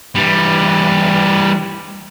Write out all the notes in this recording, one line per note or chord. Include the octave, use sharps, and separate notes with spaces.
E3 G3